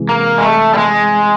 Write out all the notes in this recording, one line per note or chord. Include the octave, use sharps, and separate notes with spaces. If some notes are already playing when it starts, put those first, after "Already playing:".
Already playing: C3 E3 G#3
A#3
G#3
A3
G3
G#3